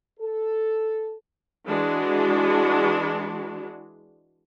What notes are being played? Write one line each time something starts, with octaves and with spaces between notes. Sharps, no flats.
A4
E3 G#3 D4 F#4